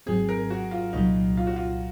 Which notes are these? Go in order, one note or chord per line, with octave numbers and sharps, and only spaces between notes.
G#1 G#2 F#3 C4 G#4
A#4
F#4
F4
C2 A#2 F#3 D#4
F4
F#4
F4